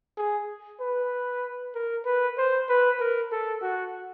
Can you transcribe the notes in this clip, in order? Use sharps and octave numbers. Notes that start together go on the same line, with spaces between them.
G#4
B4
A#4
B4
C5
B4
A#4
A4
F#4